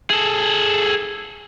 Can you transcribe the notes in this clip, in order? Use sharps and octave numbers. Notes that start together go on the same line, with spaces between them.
G#4 A4